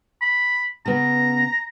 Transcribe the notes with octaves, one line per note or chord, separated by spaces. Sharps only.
B5
C#3 B3 A#5